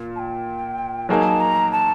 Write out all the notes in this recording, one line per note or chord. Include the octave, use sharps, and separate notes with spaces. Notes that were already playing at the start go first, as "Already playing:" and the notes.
Already playing: A#2
A5
G5
F#3 A#3 D#4 G#4 A5
A#5
A5